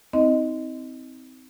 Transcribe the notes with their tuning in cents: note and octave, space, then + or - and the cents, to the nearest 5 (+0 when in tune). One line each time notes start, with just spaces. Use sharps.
C4 -15 D#4 +35 D#5 +0